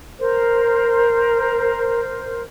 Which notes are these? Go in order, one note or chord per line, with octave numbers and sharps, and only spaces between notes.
A#4 C5